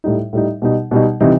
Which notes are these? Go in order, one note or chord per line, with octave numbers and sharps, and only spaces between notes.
A2 G3 D#4
A2 G3 D#4
B2 G3 D#4
B2 G3 D#4
C3 E3 G3 D#4